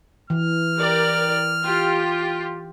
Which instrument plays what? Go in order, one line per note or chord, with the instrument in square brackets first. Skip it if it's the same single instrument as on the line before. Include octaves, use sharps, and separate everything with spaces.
[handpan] E3 [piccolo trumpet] F6
[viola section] G4 A#4 D5
F4 G4